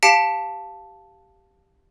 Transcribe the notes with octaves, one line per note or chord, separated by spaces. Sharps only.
G4 F5 A5 B6 C#7 D7